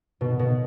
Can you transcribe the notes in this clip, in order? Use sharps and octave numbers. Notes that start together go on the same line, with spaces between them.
B2
B2